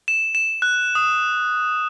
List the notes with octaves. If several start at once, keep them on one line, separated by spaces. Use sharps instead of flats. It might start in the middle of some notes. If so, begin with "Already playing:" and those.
E7
E7
F#6
D#6